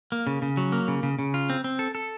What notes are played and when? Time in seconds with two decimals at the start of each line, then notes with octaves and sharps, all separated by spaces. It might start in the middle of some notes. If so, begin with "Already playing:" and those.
0.12 A#3
0.27 C#3
0.42 C#3
0.57 F#3
0.72 A#3
0.88 C#3
1.03 C#3
1.19 C#3
1.34 F4
1.50 C4
1.64 C4
1.79 A4
1.95 A4